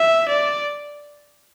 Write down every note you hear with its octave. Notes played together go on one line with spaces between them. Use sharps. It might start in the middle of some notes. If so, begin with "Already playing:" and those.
Already playing: E5
D5